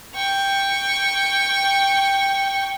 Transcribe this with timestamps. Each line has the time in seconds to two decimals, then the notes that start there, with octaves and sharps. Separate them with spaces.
0.16 G5 C#6